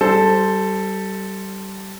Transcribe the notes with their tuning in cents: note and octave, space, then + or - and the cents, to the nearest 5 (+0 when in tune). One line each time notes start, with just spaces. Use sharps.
G3 -25 A4 +0 C5 +0